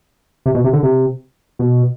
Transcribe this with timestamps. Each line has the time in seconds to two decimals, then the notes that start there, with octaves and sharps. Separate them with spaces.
0.46 C3
0.54 B2
0.64 C3
0.73 D3
0.83 C3
1.59 B2